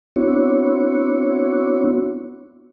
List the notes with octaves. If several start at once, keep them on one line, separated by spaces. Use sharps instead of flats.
B3 C4 D4 E4 F#4 C#5